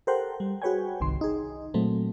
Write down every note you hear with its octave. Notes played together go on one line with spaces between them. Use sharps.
G4 A4 A#4 C5 F#5 G5
G3
F#4 G#4 B4 C#5 G5 G#5
G1 C2 D#3 C6
D#4 G#4
A#2 F#3 A3 C4